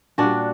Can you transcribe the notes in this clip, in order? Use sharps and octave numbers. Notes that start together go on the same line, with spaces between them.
A#2 G3 D4 F#4